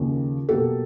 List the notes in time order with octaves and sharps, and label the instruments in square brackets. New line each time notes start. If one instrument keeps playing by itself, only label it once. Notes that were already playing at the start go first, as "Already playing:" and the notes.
Already playing: [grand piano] D#2 C#3 F3 A#3 C#4
[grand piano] B2 F#3 A#3 [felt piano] G4 A4